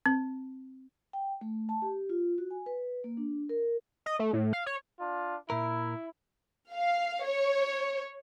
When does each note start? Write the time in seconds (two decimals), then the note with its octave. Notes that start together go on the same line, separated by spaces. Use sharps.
0.06 C4
1.13 G5
1.41 A3
1.69 A5
1.82 G4
2.09 F4
2.38 F#4
2.51 G#5
2.66 B4
3.04 A#3
3.17 D4
3.49 A#4
4.06 D#5
4.19 A3
4.33 A2
4.53 F5
4.66 C#5
5.00 D4 F4
5.50 A#2 E4 A#4
6.75 F5
7.26 C#5